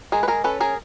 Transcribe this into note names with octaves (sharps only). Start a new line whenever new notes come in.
G#3 G#4 A#4
B4
G#4 A#4
C#4 A4 B4
G#4 A#4